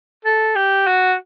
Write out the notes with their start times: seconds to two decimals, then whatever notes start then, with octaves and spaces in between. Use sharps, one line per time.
0.24 A4
0.55 G4
0.87 F#4